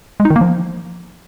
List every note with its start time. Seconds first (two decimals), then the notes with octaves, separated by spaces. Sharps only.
0.20 G#3
0.25 D#4
0.30 D#3
0.36 A#3
0.41 F3